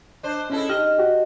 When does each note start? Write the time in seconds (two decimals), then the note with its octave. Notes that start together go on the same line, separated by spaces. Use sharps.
0.23 D4 C5
0.50 G#3 C#4 E4 A4
0.69 D#4 G4 D#5 F6
0.99 F#4 G4